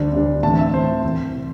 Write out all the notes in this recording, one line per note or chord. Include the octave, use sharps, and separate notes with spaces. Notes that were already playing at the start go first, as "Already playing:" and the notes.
Already playing: D2 D3 G3 D4
D2 D3 G3 D4
A2 E3 C4 A5
E5
A2 E3 C4 C5
C2 C3 E3
C3